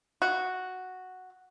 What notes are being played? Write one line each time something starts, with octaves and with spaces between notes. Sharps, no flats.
F#4